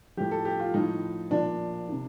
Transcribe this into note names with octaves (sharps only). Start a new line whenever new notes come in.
A2 F3 G4
A4
G4
F4
A2 F3 D#4
A#2 F3 D4
C3 D#3